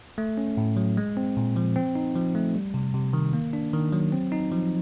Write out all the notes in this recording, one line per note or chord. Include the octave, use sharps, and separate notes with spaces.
A3
C#4
A2
F#3
G#3
C4
A#2
F3
C4
D#4
F3
A3
G3
C3
C3
D#3
A#3
D4
D#3
F#3
C4
D#4
F3